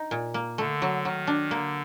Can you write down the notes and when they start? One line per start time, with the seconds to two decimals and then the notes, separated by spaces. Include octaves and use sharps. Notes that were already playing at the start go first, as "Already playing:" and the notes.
Already playing: D#4
0.11 A#2
0.34 A#3
0.58 D3 A3
0.82 F#3
1.05 D#3 F#3
1.27 D4
1.51 D3 A#3